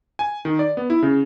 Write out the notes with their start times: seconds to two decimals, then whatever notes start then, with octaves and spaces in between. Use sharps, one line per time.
0.19 G#5
0.45 D#3
0.59 D5
0.77 B3
0.90 E4
1.02 C#3